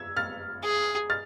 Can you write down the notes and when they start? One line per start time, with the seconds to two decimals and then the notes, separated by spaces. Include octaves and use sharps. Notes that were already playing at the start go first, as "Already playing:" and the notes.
Already playing: E6 G#6
0.17 F6 A6
0.63 G#4
1.10 F6 A6